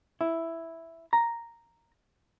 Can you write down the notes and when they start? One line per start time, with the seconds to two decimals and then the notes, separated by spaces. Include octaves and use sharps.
0.21 E4
1.13 A#5